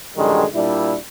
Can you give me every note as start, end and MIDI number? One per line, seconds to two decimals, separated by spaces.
0.17 0.44 33
0.17 0.44 42
0.17 0.44 50
0.17 0.44 51
0.17 0.44 55
0.17 0.44 56
0.54 0.95 46
0.54 0.95 55
0.54 0.95 62
0.54 0.95 64